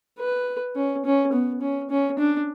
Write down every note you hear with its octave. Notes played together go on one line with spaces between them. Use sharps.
B4
C#4
C#4
B3
C#4
C#4
D4